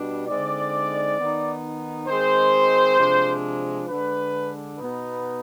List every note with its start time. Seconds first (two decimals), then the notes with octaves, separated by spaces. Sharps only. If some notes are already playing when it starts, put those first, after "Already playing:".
Already playing: B2 G3 D4
0.26 D3 G#3 C4 D#4 D5
1.18 D#3 B3 D#4
2.07 D#3 G#3 C4 C5
2.98 C3 F3 G#3 D4
3.88 D3 G#3 D4 B4
4.78 B2 B3 D#4 B4